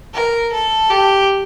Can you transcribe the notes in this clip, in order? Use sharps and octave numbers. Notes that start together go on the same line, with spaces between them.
A#4
A4
G4